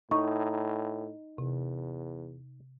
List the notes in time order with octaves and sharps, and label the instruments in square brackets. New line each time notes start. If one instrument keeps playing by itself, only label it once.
[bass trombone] A2 [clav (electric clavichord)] D#4 [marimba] C#6
[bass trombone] E2 [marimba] C3